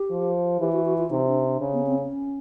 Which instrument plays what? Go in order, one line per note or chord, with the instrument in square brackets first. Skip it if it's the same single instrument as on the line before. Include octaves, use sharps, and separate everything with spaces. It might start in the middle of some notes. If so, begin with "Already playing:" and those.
Already playing: [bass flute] G4
[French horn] F3
[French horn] E3 [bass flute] G4
[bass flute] F#4
F#4
F4
[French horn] C3 [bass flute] D#4
[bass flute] D4
D4
[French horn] C#3
[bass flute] B3
C4
C#4